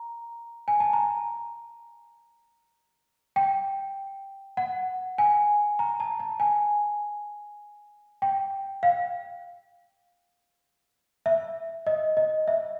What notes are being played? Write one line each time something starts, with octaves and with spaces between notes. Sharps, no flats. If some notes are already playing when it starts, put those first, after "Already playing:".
Already playing: A#5
G#5
A5
A#5
G5
F#5
G#5
A#5
A5
A5
G#5
G5
F5
E5
D#5
D#5
E5